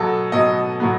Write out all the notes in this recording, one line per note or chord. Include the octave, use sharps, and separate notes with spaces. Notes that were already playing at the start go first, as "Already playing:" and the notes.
Already playing: B2 F#3 B3 A4
B2 F#3 B3 D#5
B2 F#3 B3